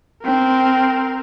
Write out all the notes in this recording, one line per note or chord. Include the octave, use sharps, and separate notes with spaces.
C4 A#4